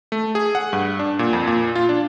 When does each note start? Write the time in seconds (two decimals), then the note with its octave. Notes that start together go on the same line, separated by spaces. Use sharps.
0.12 A3
0.35 G#4
0.55 F#5
0.73 G2
0.99 D4
1.19 A#2
1.33 F2
1.47 A#2
1.75 F4
1.89 D4